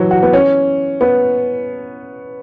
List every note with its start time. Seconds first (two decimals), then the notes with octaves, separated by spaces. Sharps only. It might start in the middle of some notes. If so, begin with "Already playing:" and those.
Already playing: E3 F#3
0.11 F#4
0.23 B3
0.33 C#4
1.01 B3